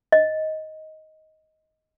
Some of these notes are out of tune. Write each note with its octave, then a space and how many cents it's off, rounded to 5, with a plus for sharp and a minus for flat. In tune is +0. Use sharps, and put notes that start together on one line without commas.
D#5 +10